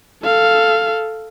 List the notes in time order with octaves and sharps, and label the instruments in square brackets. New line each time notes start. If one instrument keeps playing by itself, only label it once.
[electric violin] A4 F5